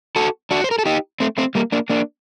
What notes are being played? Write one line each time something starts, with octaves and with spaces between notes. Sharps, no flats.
F#4 A4
D4 F#4
C5
A#4
A4
D#4 G4
A3 C4
A3 C4
G3 A#3
A#3 D4
A#3 D4